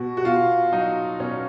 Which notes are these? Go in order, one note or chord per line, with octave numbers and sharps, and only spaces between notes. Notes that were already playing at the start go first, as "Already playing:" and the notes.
Already playing: B2 F#4
F#4
B2 F4
F#3 D#4
B2 C#4